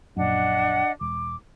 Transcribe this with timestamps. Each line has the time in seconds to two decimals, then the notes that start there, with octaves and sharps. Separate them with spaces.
0.17 A#1 F#2 D4 D#5 F#5
1.01 E1 D6